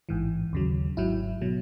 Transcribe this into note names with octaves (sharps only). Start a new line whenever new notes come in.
A1 G#2 E3
D#2 C#3 F#3
G#1 G#2 F#3 E4
B2 F#3